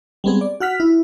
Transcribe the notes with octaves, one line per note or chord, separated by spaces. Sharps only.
G3 G#3 B3 C4 G#4
D5
F#4 F#5 F6 B6
E4